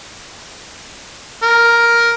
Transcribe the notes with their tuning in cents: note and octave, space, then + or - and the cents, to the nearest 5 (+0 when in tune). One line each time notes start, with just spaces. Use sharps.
A#4 +5